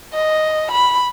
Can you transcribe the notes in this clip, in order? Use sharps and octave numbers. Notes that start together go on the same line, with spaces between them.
D#5
B5